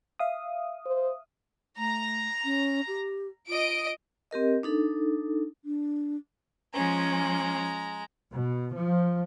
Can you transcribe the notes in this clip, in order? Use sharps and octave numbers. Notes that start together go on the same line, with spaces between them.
E5 F5 D#6
C5
A3 A#5
C#4
G4
F4 D#5 D7
C4 G4 A#4 D#5
D4 D#4 A4
D4
F3 G#3 C#4 A#5
B2
F3